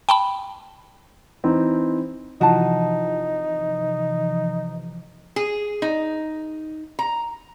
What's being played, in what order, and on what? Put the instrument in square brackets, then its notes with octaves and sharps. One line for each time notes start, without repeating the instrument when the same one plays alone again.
[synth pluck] G5 A5 B5
[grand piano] E3 C4 D#4
[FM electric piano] C3 E3 F3 [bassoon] D#4 [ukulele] F#4 A5
[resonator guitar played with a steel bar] G#4
D#4
A#5